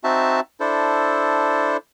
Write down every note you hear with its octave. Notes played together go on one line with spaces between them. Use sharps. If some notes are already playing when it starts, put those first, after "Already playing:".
C4 D#4 F#4 E5 A5
D4 E4 A4 C5